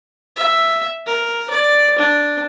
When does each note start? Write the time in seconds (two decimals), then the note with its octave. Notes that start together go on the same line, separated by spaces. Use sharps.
0.37 E5
1.06 A#4
1.50 D5
1.98 D4